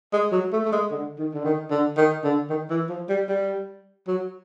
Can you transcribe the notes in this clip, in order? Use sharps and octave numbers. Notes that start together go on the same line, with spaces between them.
G#3
F#3
A3
A3
G#3
D3
D#3
D3
D#3
D3
D#3
D3
D#3
E3
F3
G3
G3
F#3